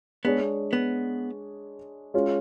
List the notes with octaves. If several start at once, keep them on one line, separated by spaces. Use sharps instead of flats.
G#3 B3 D4 G#4 C#5
B3
G#3 C#4 F4